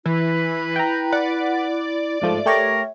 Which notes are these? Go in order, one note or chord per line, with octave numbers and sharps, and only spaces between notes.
E3 E4 B4
G5 A#5
D5 F#5
G#2 F3 A3 E5
A3 G4 A#4 C#5